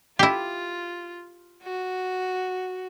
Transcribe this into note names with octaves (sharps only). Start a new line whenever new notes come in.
E4 F4 G4
F#4